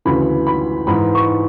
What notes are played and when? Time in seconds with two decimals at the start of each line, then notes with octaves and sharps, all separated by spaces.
0.05 D2 C#3 E3 B5
0.47 B5
0.87 G#2 E3 B5
1.15 C#6